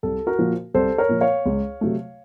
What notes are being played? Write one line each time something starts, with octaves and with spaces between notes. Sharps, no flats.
C2 A4
F#4 A#4
A#2 F3
C2 A4 C5
A#4 C#5
A#2 F3
C#5 F5
C#2
C3 F#3 A3